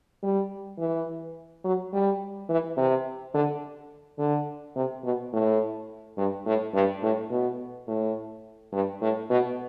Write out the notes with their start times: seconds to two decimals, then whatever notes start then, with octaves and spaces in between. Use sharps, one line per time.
0.23 G3
0.79 E3
1.65 F#3
1.93 G3
2.49 E3
2.77 C3
3.34 D3
4.19 D3
4.76 C3
5.04 B2
5.33 A2
6.18 G2
6.46 A2
6.74 G2
7.03 A2
7.31 B2
7.88 A2
8.73 G2
9.02 A2
9.30 B2